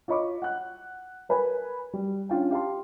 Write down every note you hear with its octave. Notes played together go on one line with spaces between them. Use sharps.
F4 C#5 D#5 B5 C#6 D6
F#5 F#6
A#4 B4 G#5 B5
G3
C#4 D4 F4 G5
G4 F5 A5 C6